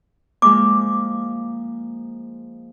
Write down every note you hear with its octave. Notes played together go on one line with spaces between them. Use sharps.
F3 G#3 A#3 D6